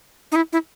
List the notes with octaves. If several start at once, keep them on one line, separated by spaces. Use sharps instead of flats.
D#4
E4
E4